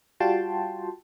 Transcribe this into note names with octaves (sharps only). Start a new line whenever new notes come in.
G3 F4 F#4 G5 A5 C6